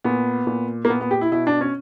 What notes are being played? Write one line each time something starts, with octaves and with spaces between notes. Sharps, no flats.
A#2 B3
A#2
A#3
A#2 B3
B3
G4
E4
B2 E4
D4
C#4